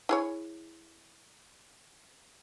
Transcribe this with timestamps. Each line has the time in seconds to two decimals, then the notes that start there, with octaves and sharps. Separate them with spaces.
0.09 E4 G#4 C#5